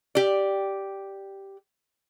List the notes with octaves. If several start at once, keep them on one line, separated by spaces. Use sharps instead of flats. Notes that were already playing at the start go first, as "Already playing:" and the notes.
G4 D5